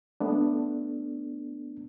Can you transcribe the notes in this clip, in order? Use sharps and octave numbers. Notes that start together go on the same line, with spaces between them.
A3 B3 D4